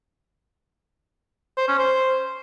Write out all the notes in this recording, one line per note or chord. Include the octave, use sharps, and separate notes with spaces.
C5
C#4
C5